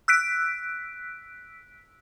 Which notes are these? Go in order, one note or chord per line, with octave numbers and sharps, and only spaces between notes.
E6 F#6 B6 D7